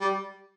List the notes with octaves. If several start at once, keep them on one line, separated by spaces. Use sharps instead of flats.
G3